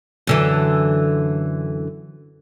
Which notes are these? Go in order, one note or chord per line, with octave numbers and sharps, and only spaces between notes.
F#2 D3 E3